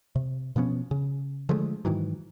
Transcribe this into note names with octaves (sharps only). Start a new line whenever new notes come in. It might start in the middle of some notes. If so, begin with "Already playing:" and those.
C3
B2 F3 B3 C#4
C#3
D3 F3 G#3 A3
G#2 D#3 E3 F#3